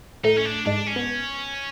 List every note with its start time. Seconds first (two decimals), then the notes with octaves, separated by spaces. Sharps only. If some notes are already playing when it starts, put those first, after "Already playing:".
0.24 A2 A3 D#4
0.37 C#4
0.45 D4
0.66 G#2 G#3 D4
0.87 C#4
0.96 B3